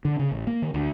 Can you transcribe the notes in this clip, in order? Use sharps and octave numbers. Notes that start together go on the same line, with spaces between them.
D3
C#3
A1
A#3
D#3
D2